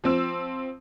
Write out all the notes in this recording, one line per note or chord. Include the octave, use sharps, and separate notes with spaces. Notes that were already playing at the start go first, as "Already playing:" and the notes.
F3 C4 E6